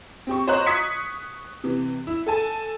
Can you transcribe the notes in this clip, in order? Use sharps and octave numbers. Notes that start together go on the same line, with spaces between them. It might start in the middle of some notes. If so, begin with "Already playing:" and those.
C4 G4 C#6
C5 C#5 D#5 A#5 C#6 F#6
C#6 D#6 G#6 B6 C#7
C3 E3
E4
A4 G#5 A5